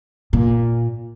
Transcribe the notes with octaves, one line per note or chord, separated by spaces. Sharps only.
A#2